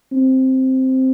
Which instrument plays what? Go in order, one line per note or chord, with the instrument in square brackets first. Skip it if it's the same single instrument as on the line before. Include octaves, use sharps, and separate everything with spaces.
[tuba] C4